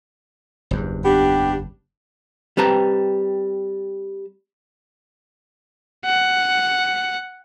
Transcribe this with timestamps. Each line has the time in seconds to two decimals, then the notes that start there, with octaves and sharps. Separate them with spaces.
0.71 F#1 E2 G2
1.04 B3 D4 G4
2.57 G3 C4 B4 A5 A#5
6.05 F#5